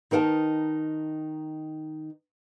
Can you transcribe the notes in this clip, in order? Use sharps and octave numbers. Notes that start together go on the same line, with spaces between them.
D#3 D#4 A#4 F#5 A5